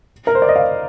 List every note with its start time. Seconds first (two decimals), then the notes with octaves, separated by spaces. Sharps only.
0.27 A#4
0.35 C5
0.42 D5
0.49 D#5
0.56 F5